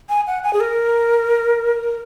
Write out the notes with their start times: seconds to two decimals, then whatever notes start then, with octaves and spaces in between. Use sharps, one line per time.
0.09 G#5
0.27 F#5
0.44 G#5
0.53 G#4
0.60 A#4